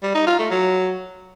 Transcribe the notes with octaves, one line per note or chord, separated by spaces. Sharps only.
G3
D#4
F4
A3
F#3